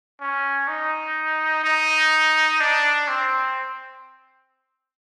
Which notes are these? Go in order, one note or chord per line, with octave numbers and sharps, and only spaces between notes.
C#4
D#4
D#4
D4
C4